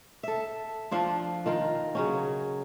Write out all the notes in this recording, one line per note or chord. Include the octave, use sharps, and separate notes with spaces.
A4 E5
F3 D4 F4
D#3 F4 A#4
C#3 F#3 C#4